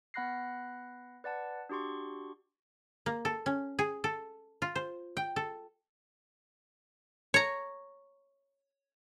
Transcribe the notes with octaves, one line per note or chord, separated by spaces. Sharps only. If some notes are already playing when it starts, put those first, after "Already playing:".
B3 F#5 B5 F#6 A#6 C7
B4 D5 F#5 A5
D4 F#4 G4 C6 C#6
A#3
A4
C#4
G#4
A4
F4
C5
G5
A4
C#5 A#5